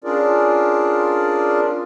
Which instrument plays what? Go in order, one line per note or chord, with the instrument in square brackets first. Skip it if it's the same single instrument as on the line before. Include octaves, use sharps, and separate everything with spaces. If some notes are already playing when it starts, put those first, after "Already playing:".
[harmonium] C#4 D4 F4 G#4 A#4 D5